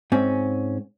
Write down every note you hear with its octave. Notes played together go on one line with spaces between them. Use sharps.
G#2 C4 C#4